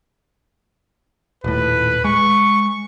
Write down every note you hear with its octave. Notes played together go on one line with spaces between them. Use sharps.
D#1 A2 B4
G#3 C#6